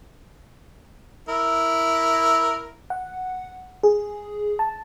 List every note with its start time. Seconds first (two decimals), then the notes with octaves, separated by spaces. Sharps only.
1.28 E4 A#4
2.90 F#5
3.83 G#4
4.59 A5